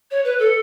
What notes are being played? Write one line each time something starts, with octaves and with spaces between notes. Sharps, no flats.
C#5
B4
A4